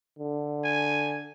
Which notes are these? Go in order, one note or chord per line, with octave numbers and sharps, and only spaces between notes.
D3
G#5